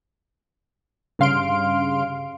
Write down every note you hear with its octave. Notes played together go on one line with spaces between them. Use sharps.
G2 C#3 F5 C6 F6 D7